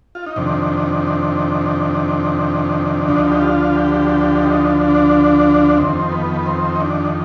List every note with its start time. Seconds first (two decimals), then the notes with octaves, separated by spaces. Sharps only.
0.15 F4
0.26 D#4
0.36 F2 C3 D#3 D4
3.07 D2 D3 F3 D#4
3.30 G4
3.41 F4
3.76 G4
4.09 G4
4.42 D#4
4.88 D4
5.78 F2 D#3 C4
6.12 B3
6.46 C4
6.76 D#4
6.80 D4